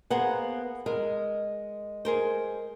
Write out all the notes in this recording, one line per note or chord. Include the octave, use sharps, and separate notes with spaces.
A#3 B3 G#4 C5 F#5
G#3 A#4
G#4 A#4 C5